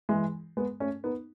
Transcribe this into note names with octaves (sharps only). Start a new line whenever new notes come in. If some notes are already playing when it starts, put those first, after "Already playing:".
E3 G#3
G#3 B3
A3 C#4
B3 D#4